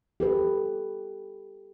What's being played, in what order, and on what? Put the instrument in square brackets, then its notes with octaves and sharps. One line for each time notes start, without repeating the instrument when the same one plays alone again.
[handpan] G4 A4 B4